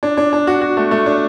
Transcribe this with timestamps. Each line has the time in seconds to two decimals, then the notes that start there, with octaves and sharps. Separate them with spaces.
0.03 D4
0.17 D4
0.33 D4
0.47 F#4
0.61 F#4
0.77 A3
0.91 A3
1.06 D4